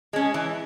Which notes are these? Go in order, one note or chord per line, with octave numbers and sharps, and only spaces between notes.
G#3 C#4
E3